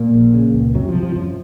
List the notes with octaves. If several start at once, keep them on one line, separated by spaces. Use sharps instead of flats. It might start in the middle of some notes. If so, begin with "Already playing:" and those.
Already playing: A#2 A#3
A#1
C#3
C#2
F#2 C3 F#3
F3
C3
F3
F#2 F3